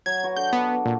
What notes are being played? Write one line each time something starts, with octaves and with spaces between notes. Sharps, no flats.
F#3 G#6
F#4 B4
D4 A4 G6
B3
A#2